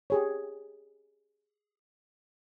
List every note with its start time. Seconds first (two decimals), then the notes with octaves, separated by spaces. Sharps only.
0.10 G4 G#4 C#5